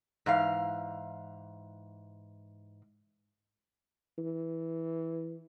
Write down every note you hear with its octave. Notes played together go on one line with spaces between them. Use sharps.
G#2 E3 F5
E3